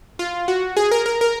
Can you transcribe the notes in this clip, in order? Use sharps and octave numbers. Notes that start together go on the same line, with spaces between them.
F4
F#4
G#4
A#4
A#4
A#4